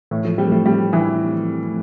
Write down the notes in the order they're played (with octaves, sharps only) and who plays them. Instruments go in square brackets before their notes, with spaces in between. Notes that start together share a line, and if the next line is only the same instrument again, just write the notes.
[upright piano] A2 [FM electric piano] E3
[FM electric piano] F3 A3
[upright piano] G3 [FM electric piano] A3 C4
[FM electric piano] F3 A3
[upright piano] G3
E3